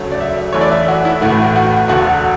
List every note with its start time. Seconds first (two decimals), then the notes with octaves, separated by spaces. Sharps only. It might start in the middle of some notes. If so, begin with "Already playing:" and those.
Already playing: D2 C#3 F#3 A3
0.12 D5
0.21 E5
0.53 F#2 E3 A3 C#5
0.61 D5
0.72 E5
0.88 F#4
1.05 E4
1.21 A1 A2 E3 A3 F#4
1.56 F#4
1.88 E1 D2 D3 A3 F#4